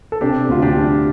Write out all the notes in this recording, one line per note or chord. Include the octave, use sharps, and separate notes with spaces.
A4
C3 D4 G4
D2 F4
D4 G4
G3